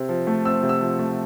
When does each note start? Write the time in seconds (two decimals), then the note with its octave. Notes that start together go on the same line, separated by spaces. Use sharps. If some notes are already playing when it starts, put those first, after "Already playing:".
Already playing: C3 C4
0.09 F3
0.27 A3
0.45 C4 E6
0.63 C3
0.69 E6
0.81 F3
0.99 A3